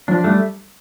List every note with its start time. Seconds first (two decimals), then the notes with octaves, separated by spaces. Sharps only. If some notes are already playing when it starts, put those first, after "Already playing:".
0.08 F3 D4
0.24 G3 A3